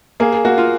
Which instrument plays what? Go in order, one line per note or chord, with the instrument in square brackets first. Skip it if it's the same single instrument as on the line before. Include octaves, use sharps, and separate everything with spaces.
[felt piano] A#3 [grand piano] G#4
[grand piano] G#4
[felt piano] A#3 [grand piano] F#4
[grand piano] F4